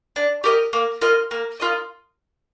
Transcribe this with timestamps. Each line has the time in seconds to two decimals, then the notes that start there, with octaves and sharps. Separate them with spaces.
0.16 D4
0.44 G4 A#4 D#5
0.73 A#3
1.01 F4 A#4 D#5
1.31 A#3
1.60 F4 A#4 D#5